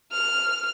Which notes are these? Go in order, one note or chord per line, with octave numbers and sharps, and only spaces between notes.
F6